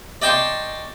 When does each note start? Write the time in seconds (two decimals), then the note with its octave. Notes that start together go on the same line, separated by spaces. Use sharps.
0.22 D5 D#5 G5 A5 C6 C#6